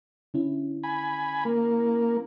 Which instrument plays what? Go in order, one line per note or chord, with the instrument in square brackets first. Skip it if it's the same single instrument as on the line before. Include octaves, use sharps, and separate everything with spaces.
[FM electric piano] D3 C#4 E4
[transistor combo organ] G#5 B5
A#3